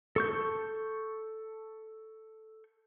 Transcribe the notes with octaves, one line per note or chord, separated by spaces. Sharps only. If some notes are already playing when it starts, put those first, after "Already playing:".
A4 C#6 G6